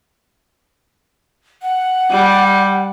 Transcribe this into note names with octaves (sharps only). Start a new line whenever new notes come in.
F#5
G3